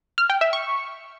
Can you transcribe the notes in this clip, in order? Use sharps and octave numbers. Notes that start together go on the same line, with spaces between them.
F6
G5
E5
C#6